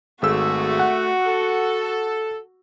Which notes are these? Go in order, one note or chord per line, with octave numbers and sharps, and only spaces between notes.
G#1 A3 F#4 G#4 E6
F#5
A4